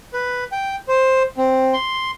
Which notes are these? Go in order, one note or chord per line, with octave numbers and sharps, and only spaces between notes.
B4
G5
C5
C4
C6